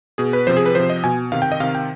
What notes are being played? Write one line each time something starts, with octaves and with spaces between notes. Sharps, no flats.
B2 G#4
B4
C3 F3 C5
G#4
B4
C3 F3 C5
D#5
B2 G#5
C3 D#3 F5
G5
D#5
C3 D#3 F5
G5